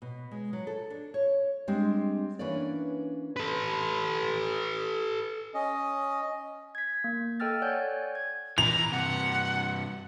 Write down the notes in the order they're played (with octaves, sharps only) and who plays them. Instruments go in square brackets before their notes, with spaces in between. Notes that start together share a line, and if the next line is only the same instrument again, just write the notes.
[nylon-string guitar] B2
G#3
F#3
A4
D4
C#5
G3 G#3 C4 D4
E3 A#3 C#4 D4 B4 D5
[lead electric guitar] A4 B4
[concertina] C#4 D#5
[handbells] G#6 B6
A#3
A4 D#5 G5 E6 F6 A6
C#5 D5 F#5 G#5 F#6 G6
G#6
[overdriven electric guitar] E3 [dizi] A#5 [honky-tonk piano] F7
[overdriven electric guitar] G2 C3 [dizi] F#5